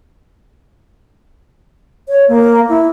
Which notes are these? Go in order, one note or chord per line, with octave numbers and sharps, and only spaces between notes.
C#5
A#3
E4